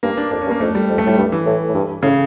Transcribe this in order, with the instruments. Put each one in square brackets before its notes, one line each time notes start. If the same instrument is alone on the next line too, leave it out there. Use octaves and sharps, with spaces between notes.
[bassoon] G2 [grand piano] A#3
[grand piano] D4
[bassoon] F2 [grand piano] D4
[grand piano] C#4
[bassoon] G2
[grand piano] A#3
[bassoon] F2 [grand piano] A3
[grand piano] G3
[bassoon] F2
[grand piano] A3
[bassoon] A2 [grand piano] G3
[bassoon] G2
[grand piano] E3
[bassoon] A2
A2
G2
[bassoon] A2 [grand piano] C#3